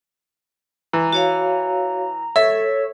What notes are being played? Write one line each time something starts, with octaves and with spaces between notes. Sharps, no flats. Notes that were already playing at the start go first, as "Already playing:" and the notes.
E3 A#5
F#4 C#5 F5
A4 C#5 E5